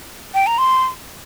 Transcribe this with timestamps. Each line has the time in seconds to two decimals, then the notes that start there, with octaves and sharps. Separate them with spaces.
0.34 G5
0.47 A#5
0.58 C6